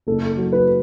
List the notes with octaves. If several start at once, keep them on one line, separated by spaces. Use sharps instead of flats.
F#1 A4
F#3
B4